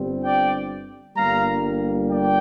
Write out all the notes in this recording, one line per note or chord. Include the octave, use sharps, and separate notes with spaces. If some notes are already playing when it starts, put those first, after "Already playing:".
Already playing: G1 G2 G3 C4
D5 G5
G1 G2 G3 A#3 F5 A#5
D5 G5